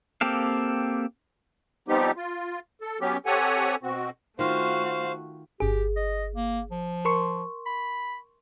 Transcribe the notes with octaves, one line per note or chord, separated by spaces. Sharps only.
A#3 C4 G4 A4 F5
F3 G3 B3 C4 D#4 G4
F4
A4
F#3 B3 C#4 G4
C4 G4 A4 C#5 F#5 G#5
B2 C4 F#4
D#3 A3 F4 F#4 C5 F5
G1 G4 G#4
D#5
A#3
F3
A#4 C6 C#6
B5